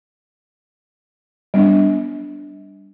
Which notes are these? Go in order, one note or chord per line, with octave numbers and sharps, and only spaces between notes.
G3 B3 D4